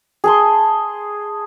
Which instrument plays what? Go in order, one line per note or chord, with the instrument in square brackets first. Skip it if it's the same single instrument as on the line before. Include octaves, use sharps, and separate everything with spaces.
[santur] G#4 A5 C6